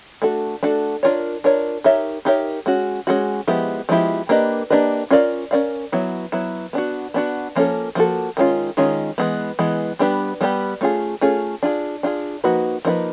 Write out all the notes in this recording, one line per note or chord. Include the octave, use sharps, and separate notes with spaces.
A3 D4 F#4 A4
A3 D4 F#4 A4
D4 F4 A#4 C#5
D4 F4 A#4 C#5
D#4 G4 A#4 C#5 E5
D#4 G4 A#4 C#5 E5
G#3 C#4 F#4
G#3 C#4 F#4
F3 G#3 B3 E4 G4
F3 G#3 B3 E4 G4
A#3 D4 G4 B4 D#5
A#3 D4 G4 B4 D#5
C#4 F4 A#4 D5 F5
C#4 F4 A#4 D5 F5
F#3 B3 E4
F#3 B3 E4
B3 D4 F#4
B3 D4 F#4
F3 A#3 C#4 F#4 A4
F3 A#3 C#4 F#4 A4
D#3 G#3 C#4 F4
D#3 G#3 C#4 F4
E3 G#3 B3
E3 G#3 B3
G3 B3 D4 G4 B4
G3 B3 D4 G4 B4
A3 C#4 F4 G#4
A3 C#4 F4 G#4
D4 F4 G#4
D4 F4 G#4
F3 A#3 D#4 F#4 B4
F3 A#3 D#4 F#4 B4